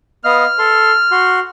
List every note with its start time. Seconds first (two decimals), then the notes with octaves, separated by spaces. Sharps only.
0.25 B3 D#5 F5 F6
0.59 A4 C6
1.11 F#4 C6